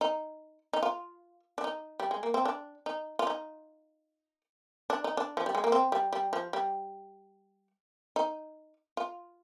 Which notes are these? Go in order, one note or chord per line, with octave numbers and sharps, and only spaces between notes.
D#4
D#4
F4
D4
D#4
G3
G#3
A#3
C4
D4
D#4
F4
D#4
D4
D#4
D4
F3
G3
G#3
A#3
C4
G3
G3
F3
G3
D#4
F4